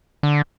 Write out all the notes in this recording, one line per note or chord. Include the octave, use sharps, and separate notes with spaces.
D3